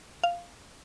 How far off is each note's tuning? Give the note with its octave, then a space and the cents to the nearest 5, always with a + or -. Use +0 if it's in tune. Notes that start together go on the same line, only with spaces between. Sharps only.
F5 -5